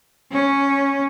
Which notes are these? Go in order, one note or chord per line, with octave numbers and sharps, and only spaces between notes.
C#4